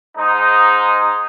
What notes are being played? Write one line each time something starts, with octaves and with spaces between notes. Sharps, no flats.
G#2 G#3 D#4